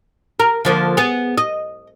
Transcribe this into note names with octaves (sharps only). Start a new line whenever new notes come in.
A#4
D3 F3 A#3
B3 G#4
D#5